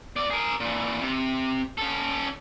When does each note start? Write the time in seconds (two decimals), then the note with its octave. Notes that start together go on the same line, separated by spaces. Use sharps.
0.16 E2 D5
0.30 G#4 A#4
0.60 A#2 E3
1.01 C3
1.78 C#4 A4